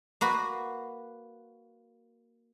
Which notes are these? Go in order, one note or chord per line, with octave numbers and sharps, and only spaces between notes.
A#3 F#4 B4